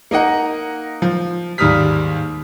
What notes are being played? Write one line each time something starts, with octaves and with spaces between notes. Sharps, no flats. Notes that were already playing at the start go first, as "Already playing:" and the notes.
A#3 D#4 D#5 F#5
F3
D#2 G#2 G3 D#6 F6 B6